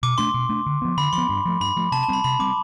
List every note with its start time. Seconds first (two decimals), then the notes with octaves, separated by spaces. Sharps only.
0.03 B2 D6
0.18 A3 D4 C6
0.34 B2
0.49 A3 D4
0.66 D3
0.82 F3 B3
0.97 D3 B5
1.13 F3 C6
1.18 B3
1.29 G2
1.45 F3 A3
1.60 G2 B5
1.77 F3 A3
1.92 C3 A5
2.03 A5
2.08 G3 C4 B5
2.24 C3 B5
2.39 G3 C4 D6